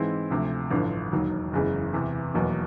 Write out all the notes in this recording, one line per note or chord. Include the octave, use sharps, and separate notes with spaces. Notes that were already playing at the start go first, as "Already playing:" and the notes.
Already playing: G#2 E3 G#3 C4 E4
D2 C3 F3 A3
A1 G2 D3 F3
E1 D#2 D#3 F#3
F#1 E2 C#3 E3 G#3
E2 C3 E3
F1 E2 B2 F#3 A#3